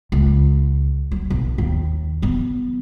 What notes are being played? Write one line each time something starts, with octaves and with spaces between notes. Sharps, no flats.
C#2
F#3
B1
D#2
F#3 B3